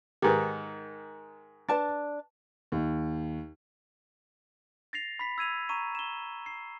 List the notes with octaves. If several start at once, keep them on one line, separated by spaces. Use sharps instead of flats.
G#2 D#3 G4 G#4 B4
D4 B4 A5 A6
D#2
A6 A#6 C7 F7
B5 B6
E6 G#6 D#7 F7
A#5 C#6 D#7
E7 G7
C7